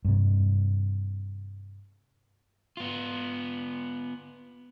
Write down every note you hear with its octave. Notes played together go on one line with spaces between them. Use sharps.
G2 C3
B3 F4